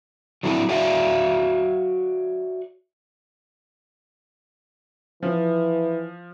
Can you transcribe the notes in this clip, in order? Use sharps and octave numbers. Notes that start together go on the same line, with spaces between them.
F#3 A3 C4 D4 E4
F#4 C#5 D5 E5 F5
E3 F3